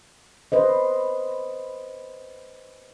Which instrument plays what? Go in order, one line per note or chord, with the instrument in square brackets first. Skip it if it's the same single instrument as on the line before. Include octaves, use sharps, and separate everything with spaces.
[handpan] B4 C5 D#5